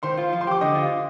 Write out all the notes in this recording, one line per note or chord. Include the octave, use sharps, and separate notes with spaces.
D#3 C5 C6
F4
F3
C6
G4 D6
D3 D#5 D#6
F4